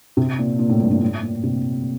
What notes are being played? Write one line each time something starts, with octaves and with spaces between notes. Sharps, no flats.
C3
A#2
A#2
A2
G2
A#2
A2
A#2
C3